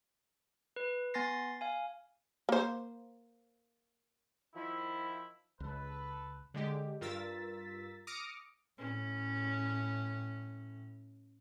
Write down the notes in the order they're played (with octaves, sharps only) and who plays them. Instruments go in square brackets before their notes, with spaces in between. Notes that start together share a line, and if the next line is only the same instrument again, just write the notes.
[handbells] B4
B3 G#5 C6 A6 A#6 C7
F5 G#5
[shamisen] A#3 C5
[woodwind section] D#3 F3 E4
[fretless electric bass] C#2 [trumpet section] A4 B4
[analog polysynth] D3 G#3 G4
G2 F4 A#4 E6 A6 B6
D6 D#6 F6 A#6 C#7 D7
[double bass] A2 [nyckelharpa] C#4